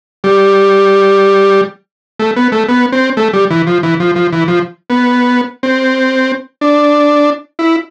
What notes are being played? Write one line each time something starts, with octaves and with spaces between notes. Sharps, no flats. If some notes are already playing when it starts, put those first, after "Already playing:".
G3
A3
B3
A3
B3
C4
A3
G3
E3
F3
E3
F3
F3
E3
F3
B3
C4
D4
E4